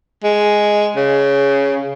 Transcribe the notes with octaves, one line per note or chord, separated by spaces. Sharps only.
G#3
C#3